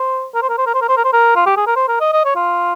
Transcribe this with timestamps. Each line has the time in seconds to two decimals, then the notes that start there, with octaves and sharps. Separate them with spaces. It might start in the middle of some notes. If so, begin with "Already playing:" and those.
Already playing: C5
0.35 A#4
0.42 C5
0.49 A#4
0.58 C5
0.66 A#4
0.74 C5
0.81 A#4
0.89 C5
0.97 A#4
1.04 C5
1.13 A#4
1.36 F4
1.46 G4
1.57 G#4
1.67 A#4
1.76 C5
1.88 A#4
2.00 D#5
2.13 D#5
2.25 C#5
2.36 F4